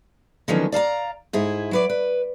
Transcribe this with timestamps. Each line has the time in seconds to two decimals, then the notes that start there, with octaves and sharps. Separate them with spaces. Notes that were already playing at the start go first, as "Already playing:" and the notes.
0.48 D3 D#3 F3 F#3 B3 C#4
0.72 D5 F5 A5 A#5
1.33 G#2 E4 G#4
1.71 F#3 B4 D5
1.90 B4